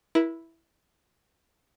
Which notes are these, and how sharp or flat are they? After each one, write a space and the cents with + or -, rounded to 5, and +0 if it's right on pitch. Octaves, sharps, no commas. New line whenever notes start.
E4 +0 A#4 +45